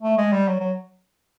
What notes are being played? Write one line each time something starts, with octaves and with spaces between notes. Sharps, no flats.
A3
G#3
G3
F#3
F#3